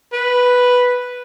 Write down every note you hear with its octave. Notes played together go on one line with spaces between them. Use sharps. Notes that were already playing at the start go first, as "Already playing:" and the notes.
B4